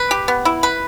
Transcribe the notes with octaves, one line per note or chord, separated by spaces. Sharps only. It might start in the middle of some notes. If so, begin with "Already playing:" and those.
Already playing: B4
G4
B3
E4
B4